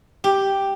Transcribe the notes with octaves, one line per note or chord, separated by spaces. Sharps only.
G4